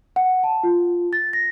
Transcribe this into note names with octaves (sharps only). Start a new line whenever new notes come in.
F#5
A5
F4
A6
A#6